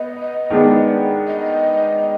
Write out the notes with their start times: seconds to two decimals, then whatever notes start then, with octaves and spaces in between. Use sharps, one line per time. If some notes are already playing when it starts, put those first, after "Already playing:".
Already playing: B3 D#5
0.50 D#3 G#3 B3 D4
1.27 D#5